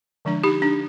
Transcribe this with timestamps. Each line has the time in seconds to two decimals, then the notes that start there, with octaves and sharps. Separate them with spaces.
0.25 D3 F3 G#3 D4
0.44 D#4 G4
0.62 D4